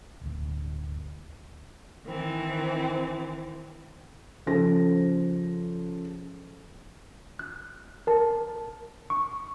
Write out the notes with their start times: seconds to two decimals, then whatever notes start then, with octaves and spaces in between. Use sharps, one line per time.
0.21 D1 G1 D2
2.07 D#3 E3 C4
4.46 C#3 F3 A4 C5 A#6
7.39 F#6
8.07 A#4 A5
9.10 C#6